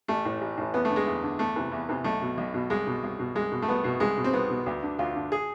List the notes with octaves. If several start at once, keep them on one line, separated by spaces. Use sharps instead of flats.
A1 A3
A2 E3
A1
A2 E3
E2 B3
A3
D3
G#3
E2
D3
E2 A3
C3 E3
E2
C3 E3
B1 A3
B2
B1
B2
C2 G#3
B2
C2
B2
C2 G#3
B2
A3
C2 B3
B2
C2 G#3
B2
C4
C2 B3
B2
D2
D3
D2 F4
D3
G#4